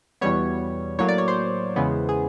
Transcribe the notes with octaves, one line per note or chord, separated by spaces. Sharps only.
E2 B2 G3 B3 C#5
A2 F#3 A#3 C#5
D5
C#5
C5
E2 C#3 E3 G#3 B3
G#4